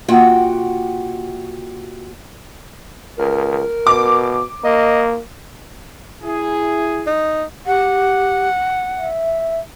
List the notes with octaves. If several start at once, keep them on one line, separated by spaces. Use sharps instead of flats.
C3 A#3 F4 F#4 F#5 G5
C#2 A#4
B2 D6
A#3 D#5
E4 G#4
D#4
G4 F#5
E5